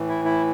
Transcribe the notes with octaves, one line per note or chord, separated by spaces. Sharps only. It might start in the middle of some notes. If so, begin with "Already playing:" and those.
Already playing: A2 E3
E4
E4